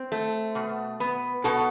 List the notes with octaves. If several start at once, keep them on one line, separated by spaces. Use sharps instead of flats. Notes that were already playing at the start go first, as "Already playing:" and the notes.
Already playing: C4
A3
B2
B3
B2 A4